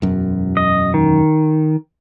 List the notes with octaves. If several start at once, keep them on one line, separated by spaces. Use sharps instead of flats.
E1 F#2
D#5
D#3